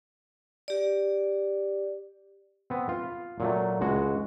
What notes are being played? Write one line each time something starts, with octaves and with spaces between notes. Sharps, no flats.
G4 D5
B3 C4
F4
A#2 F#3 A3
C#2 G#3 F#4